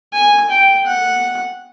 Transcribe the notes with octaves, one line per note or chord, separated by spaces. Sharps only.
G#5
G5
F#5